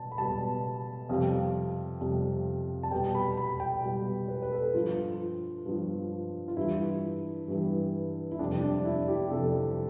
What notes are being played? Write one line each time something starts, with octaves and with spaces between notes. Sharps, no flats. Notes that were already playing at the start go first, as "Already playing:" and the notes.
Already playing: B2 A5
B5
B2 G3 A5
F2 C3 G3 F5
F2 C3 G3
A5
B2 G3 G5
B5
B5
G5
B2 G3
B4
B4
A4
G2 F3 F4
G2 F3
F4
G2 E3 G3 E4
G2 E3 G3
E4
F2 C3 G3 D4
D4
E4
G4
F2 C3 G3 A4